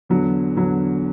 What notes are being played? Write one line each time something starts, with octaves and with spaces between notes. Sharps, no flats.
E2 D3 F#3
E2 D3 F#3